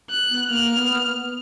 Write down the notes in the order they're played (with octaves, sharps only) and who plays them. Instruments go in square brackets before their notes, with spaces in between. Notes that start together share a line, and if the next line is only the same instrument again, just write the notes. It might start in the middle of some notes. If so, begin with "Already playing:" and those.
[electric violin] F#6
[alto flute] B3
[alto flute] A#3 [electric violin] F6
[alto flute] B3